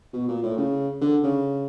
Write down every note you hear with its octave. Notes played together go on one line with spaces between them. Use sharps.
B2
A#2
A2
C#3
D3
C#3